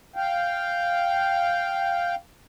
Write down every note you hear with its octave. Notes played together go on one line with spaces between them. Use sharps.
F5 G5